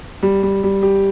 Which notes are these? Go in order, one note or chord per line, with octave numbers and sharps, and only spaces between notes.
G3
G3
G3
G4